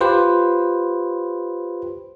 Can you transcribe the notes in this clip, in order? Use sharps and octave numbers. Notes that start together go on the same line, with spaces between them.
F4 G4 B4 C5